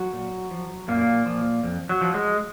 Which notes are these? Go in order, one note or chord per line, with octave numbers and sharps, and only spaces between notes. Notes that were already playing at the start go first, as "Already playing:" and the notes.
Already playing: F#3 F#4
A#2
F3
F#2 A#2 A#3
F3
F2
F#3
F3
G#3